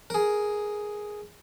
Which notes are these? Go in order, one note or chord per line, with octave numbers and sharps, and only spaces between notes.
G#4 A#4